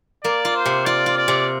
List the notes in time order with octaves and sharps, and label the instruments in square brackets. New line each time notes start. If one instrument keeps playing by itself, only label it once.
[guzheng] A#3 [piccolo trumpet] D5
[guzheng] F4
[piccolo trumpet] C5
[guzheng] C3
[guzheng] F4 [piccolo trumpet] D5
[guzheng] F4
[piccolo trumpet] D5
[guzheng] C3